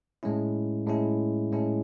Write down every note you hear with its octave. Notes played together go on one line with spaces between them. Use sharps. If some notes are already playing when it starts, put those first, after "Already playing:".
A2 G#3 C#4 E4
A2 G#3 C#4 E4
A2 G#3 C#4 E4